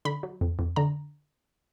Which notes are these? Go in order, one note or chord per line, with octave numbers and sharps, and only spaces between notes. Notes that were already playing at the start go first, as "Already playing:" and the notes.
D3 B5
F#3
F2
F2
D3 A#5